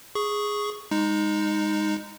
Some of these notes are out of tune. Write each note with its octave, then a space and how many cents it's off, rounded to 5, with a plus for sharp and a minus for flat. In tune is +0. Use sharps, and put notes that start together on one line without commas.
G#4 +0 C#6 +0
G#3 -25 D#4 +0